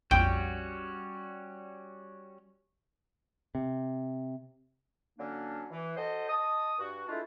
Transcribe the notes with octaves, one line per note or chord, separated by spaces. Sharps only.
A#1 F2 G3 C#4 F#4 G5
C3
D3 F#3 A#3 C#4 D4
E3
F#4 A4 C5 D#5
D#5 A5 D#6
G2 F#4
G#3 A3 D4 E4 F4